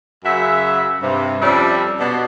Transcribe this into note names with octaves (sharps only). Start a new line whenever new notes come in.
F#2 C#3 F#4 E5
G2 C3
F2 G3 C#4 D4 D5 E5
B2 D4